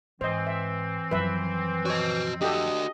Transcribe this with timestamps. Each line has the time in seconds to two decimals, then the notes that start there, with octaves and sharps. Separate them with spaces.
0.21 G#2 E3 C4 C5 D#5
0.47 E5
1.11 F#2 F3 B4 E5
1.85 F#4 C#5 D#5
2.42 D4 F#4 G4 A4 D#5